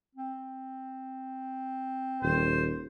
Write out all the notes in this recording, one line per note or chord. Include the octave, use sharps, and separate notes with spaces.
C4
D#1 C5